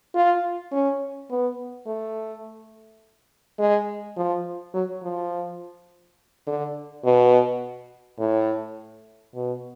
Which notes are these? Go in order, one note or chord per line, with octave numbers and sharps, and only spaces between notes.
F4
C#4
B3
A3
G#3
F3
F#3
F3
D3
B2
A2
B2